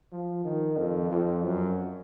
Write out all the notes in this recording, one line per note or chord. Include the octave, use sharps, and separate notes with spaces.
F3
D#3
F2
F2
F#2